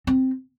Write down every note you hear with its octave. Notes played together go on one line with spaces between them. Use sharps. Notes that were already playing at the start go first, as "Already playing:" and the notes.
C4